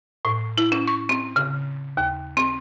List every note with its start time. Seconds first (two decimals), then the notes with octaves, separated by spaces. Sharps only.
0.25 A2
0.58 E4
0.72 C#4
0.88 C#6
1.09 C4
1.36 C#3
1.97 D#2
2.37 C4